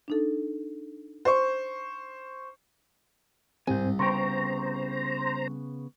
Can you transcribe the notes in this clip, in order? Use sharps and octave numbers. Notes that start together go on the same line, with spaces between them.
D4 D#4 A4
C5 C#6
C2 G#2 G3 C4 C5 G#5
C#3 B3 C5 G5 A#5 C#6